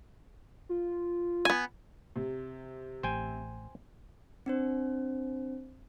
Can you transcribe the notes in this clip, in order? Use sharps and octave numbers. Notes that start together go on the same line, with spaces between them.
F4
B3 G#5
C3
A1 C5 G5 G#5
C4 D4 C5